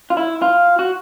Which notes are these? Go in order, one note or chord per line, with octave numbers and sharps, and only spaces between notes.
F4
E4
F4
F#4